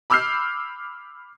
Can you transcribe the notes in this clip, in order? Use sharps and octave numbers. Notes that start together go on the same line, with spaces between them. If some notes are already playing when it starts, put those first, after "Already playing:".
B5 D6 E6 F6 G6 C7